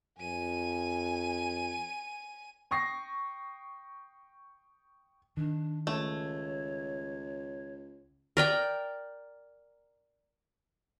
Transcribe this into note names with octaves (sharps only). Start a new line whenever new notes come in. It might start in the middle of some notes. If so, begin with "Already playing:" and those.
F2 G#5 D#7
G5 C#6 D#6 A#6 C7
D#3 D4
C#2 A3 C#5
A#4 D5 G5